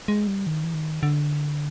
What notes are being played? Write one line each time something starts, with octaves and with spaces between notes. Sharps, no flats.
G#3
G3
D#3
E3
D#3
D3